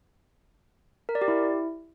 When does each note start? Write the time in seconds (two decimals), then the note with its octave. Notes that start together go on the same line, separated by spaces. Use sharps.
1.09 A#4
1.15 D5
1.22 G4
1.28 E4